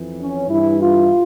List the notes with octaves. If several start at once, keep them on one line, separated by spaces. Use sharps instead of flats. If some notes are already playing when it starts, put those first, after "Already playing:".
Already playing: F2 E3
C#4
G2 E3 E4
F4